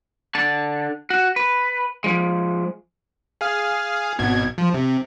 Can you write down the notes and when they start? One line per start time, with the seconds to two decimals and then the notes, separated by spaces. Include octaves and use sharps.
0.35 D3 A5
1.10 F#4
1.36 B4
2.04 F3 G#3
3.41 G#4 F5
4.19 G#1 B2 G#6
4.58 F3
4.74 C3